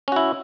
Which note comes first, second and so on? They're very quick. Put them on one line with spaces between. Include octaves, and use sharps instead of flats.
C#4 F#4 E4